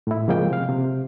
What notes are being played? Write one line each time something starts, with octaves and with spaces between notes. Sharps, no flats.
A2 E4
C#3 F3 G#3 A#3 G5
C3 F5
C3